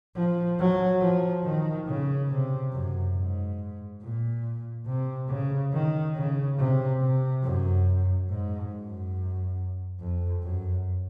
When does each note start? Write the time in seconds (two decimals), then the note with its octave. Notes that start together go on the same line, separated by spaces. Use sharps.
0.16 F3
0.59 F#3
1.01 F3
1.44 D#3
1.87 C#3
2.30 C3
2.73 F#2
3.15 G#2
4.02 A#2
4.86 C3
5.29 C#3
5.73 D#3
6.15 C#3
6.58 C3
7.01 C3
7.43 F#2
8.29 G#2
8.72 F#2
10.00 F2
10.43 F#2